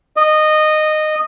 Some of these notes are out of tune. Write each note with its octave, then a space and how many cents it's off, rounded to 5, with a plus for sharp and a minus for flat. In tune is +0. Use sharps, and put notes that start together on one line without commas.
D#5 -15